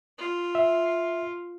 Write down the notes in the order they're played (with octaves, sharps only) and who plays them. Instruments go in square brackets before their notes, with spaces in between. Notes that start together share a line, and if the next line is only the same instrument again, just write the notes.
[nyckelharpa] F4
[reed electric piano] E5